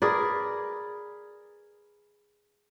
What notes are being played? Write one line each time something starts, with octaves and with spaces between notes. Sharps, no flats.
G#4 A#4 B4 D5